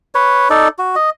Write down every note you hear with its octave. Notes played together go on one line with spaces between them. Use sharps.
B4 C#5
D#4 A4 D5
F#4
D#5